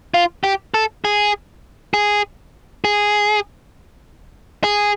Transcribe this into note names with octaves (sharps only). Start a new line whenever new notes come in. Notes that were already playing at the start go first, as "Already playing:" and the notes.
F4
G4
A4
G#4
G#4
G#4
G#4